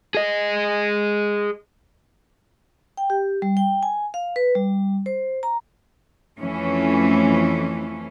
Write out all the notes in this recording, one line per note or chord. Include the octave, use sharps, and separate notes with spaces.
G#4 D#5
G5
G4
G3
G5
G#5
F5
B4
G3
C5
A#5
F2 E3 A3 C#4